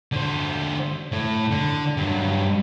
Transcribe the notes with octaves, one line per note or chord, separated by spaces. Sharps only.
D3 C5
A2
D3
G2 F#3